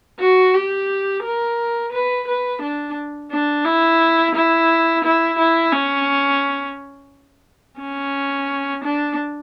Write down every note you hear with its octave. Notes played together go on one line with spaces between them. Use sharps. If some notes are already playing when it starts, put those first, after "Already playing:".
F#4
G4
A#4
B4
B4
D4
D4
E4
E4
E4
E4
C#4
C#4
D4